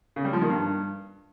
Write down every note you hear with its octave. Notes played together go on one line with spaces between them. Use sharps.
C#3
G3
F3
D#3
G2